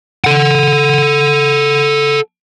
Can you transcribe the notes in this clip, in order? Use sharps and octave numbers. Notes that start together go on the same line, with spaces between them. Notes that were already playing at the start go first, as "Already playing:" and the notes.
A4 F#5